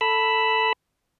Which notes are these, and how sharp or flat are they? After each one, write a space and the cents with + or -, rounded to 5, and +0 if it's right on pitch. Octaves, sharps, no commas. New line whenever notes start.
A4 +10 B5 +0 E6 +0